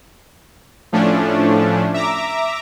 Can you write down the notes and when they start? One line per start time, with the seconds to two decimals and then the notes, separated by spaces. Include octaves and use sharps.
0.92 A2 F3 A3 C#4 D4
1.94 E5 A#5 D6